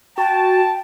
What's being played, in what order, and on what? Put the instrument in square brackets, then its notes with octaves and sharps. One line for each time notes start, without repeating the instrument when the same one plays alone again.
[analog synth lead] F#4 [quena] G5 [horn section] A5